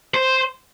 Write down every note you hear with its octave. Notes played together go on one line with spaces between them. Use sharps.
C5